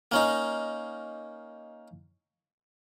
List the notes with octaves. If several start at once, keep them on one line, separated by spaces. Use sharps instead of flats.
A#3 C#4 D#4